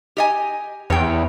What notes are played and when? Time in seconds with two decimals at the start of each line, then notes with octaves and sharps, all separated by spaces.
0.17 G4 D#5 G#5
0.90 E2 C#5 G5